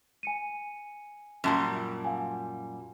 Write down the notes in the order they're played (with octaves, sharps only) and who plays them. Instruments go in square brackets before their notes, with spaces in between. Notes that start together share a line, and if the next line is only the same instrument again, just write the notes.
[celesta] G#5 C#7 D#7
[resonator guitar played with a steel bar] F#2 A#2 G3 [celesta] A5 E6
[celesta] F5 F#5 G#5